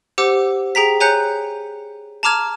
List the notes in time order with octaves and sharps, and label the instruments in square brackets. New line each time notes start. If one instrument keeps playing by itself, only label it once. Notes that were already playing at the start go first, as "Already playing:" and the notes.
[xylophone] G4 C5 F#5 D6 E6
G#4 G5 A#5 B6
C#5 G#5 A#5 F#6 G6 C#7
A5 A#5 D6 F6 G#6